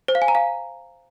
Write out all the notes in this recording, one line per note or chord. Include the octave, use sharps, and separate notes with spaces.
C5
F5
G#5
A#5
F5